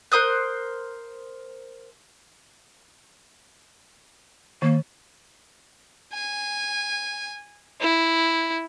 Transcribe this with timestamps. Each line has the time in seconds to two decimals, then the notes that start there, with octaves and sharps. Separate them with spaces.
0.12 A#4 C5 D#6 F#6
4.62 D#3 A#3
6.13 G#5
7.81 E4